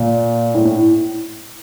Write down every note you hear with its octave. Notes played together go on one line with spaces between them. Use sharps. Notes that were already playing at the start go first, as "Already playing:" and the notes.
Already playing: A#2
A2
A2